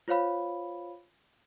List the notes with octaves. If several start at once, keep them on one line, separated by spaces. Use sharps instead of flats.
F4 C5 C#5 F5 B5